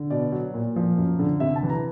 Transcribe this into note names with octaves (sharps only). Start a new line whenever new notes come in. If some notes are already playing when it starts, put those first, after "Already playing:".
Already playing: D3
B2 D5
F#3
A#2
F3
F#2
D3
C3 E5
A5
E3
A#5